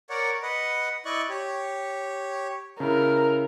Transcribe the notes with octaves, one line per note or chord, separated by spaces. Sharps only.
A#4 C#5 D5 F#5
B4 D#5 F#5
E4 D5 D#5 C#6 F#6
G4 C#5
C#3 E4 A#4